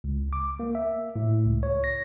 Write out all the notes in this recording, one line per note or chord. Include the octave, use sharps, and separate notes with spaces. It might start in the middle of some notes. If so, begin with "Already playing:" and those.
C#2
D6
A#3
E5
A2
C#2
C#5
A#6